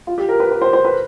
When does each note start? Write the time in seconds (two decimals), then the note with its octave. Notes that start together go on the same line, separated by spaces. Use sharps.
0.07 F4
0.18 G4
0.29 A#4
0.40 B4
0.51 B4
0.62 C5
0.73 C5
0.85 B4